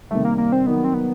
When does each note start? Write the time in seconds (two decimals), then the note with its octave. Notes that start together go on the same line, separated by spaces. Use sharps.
0.11 C3 D#3 G3 A3
0.25 A#3
0.38 A#3
0.52 C4
0.66 D#3 F#3 A#3 B3 D#4
0.84 C4
0.94 B3